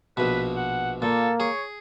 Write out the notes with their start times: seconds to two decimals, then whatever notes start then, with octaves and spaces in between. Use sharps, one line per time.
0.17 A#1 B2 B4
0.56 F#5
1.02 A#2 A#3 A4
1.40 G#4 C#5